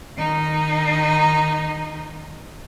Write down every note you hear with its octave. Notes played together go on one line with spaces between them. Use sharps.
D#3 D#4